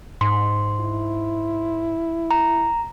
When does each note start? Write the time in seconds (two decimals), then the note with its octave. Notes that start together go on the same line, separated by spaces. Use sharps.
0.21 G#2 C6
0.80 E4
2.31 A#5